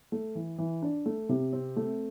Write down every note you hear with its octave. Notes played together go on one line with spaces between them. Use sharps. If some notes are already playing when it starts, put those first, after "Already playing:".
A3
E3
E3
D4
A3
C3
C4
A3